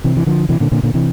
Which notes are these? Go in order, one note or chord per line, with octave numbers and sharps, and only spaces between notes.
C3 E3
E3
D3 F3
C3 E3
A#2 D3
A#2 D3
A#2 D3
C3 E3